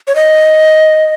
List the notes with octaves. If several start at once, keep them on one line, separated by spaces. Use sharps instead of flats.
C#5
D#5